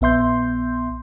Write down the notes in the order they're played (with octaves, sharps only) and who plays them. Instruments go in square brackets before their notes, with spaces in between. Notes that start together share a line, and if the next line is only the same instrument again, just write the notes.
[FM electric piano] A#1 B3 E5 C6 G6